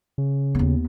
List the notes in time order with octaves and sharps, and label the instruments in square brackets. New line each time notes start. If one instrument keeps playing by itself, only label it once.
[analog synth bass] C#3
[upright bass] D#2 B3